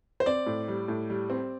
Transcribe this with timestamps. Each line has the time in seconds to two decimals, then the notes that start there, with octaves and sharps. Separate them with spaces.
0.20 C5
0.26 C4 D5
0.46 A2
0.68 G3
0.88 A2
1.10 G3
1.30 C4